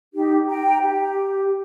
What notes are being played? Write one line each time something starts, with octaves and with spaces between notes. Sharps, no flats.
D#4 G4
G5 A#5
G4